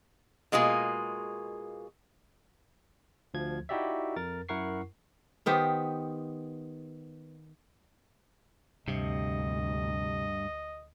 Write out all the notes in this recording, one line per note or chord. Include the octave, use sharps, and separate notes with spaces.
B2 G#3 A#3 F4 G#4
D2 F3 G#6
D#4 E4 F#4 G4 D5 E5
F2 A#4 A6
F#2 E4 A#4 F#5 C#6 C7
D#3 B3 G4 C5
D2 G2 C3 D#5